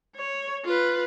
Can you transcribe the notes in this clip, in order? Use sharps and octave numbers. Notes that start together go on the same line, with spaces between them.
C#5
F4 B4